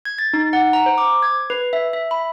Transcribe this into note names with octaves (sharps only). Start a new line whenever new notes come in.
G#6
A6
D#4
F#5
A#5
C5
D6
G#6
B4
E5
E5
B5